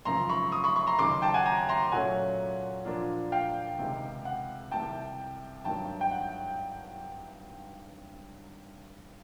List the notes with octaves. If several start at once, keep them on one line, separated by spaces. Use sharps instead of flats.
G#1 F#2 C#3 F3 A#5 C6
B5 C#6
C#6 D#6
B5 C#6
B5 C#6
A#5 C6
D#2 C#3 F#3 A#3 D#4 C6 D6
G5 A5
F#5 G#5
G#5 A#5
A#5 C6
A#2 F#3 A3 C#4 F#5 G#5
A#2 F3 A#3 D4 F4
F5 G5
C#2 C3 D#3 G#3
F#5
C2 C3 D#3 G5 A5
G#1 G2 D#3 F#3 A#3 G5 A5
G5
F#5